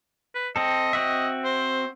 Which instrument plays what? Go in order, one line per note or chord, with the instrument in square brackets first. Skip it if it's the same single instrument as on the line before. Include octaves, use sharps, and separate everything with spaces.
[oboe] B4
[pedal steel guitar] C4 A4 [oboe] D#5
[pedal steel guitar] C4 F#4 E5
[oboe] C5